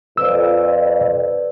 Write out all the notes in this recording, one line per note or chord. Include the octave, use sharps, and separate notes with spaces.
F2 B4 D5 E6